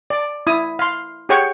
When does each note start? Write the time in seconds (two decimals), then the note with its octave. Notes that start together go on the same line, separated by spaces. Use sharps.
0.10 D5
0.47 E4 D#6
0.79 F5 C6
1.29 G4 G#4 C#5 F#5 G5 C#6